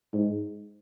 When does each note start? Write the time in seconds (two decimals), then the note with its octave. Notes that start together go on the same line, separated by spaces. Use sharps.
0.14 G#2